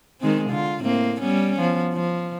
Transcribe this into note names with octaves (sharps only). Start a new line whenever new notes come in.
D#3 G#3 C4
D3 F4
A2 A#3 C4
G3 B3 C#4
F3 B3
F3